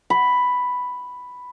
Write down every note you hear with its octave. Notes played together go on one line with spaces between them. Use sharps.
B5